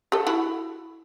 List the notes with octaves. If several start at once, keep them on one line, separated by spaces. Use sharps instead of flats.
G4 A4
E4 F#4